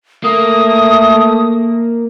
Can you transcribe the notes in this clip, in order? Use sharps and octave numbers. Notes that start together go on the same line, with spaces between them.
A3 A#3 D#6